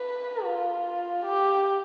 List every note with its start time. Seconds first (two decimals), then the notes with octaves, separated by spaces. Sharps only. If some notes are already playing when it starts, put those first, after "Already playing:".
Already playing: B4
0.45 F4
1.26 G4